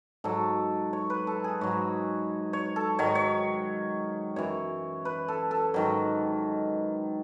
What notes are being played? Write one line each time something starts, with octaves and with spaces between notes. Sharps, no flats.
G#2 F#3 A4
C#5
B4
A4
G#4
G#2 F#3 C#5
C#5
A4
G#2 D#3 F#3 C#5
D#5
C#5
F#2 E3 C#5
B4
A4
A4
G#2 D#3 F#3